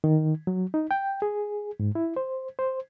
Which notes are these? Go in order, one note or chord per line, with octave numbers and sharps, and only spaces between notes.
D#3
F#3
D#4
G5
G#4
G#2
E4
C5
C5